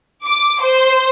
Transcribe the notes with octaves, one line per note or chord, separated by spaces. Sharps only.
D6
C5